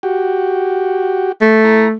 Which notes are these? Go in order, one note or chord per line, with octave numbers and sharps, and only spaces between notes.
F#4 G4
A3
E4 A#5